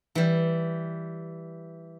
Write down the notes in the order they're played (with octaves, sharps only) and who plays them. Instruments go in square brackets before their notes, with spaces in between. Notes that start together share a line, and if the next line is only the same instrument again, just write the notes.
[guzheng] E3 G3